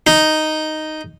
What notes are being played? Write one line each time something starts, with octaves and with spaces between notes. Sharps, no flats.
D#4